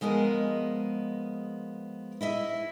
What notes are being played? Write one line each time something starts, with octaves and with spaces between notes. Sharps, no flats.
F3 G#3 B3 A#4 D#5
E4 D#5 E5